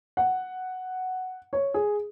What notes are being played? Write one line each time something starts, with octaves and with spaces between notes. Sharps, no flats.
F#5
C#5
G#4